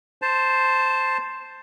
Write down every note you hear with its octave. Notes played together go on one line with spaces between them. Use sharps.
C5 A5